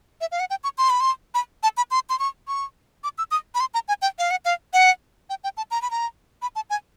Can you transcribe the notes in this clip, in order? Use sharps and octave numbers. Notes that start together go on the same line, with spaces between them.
E5
F5
F#5
G5
C#6
C6
B5
C6
B5
A5
B5
C6
C6
C#6
C#6
D6
E6
D#6
B5
C6
A#5
G#5
G5
F5
F#5
F5
F#5
G5
G5
A5
A#5
B5
A#5
B5
A5
G#5